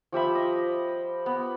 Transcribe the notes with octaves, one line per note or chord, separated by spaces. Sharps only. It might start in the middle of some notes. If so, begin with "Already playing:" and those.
F3 G4 E5 B5
D#5
B3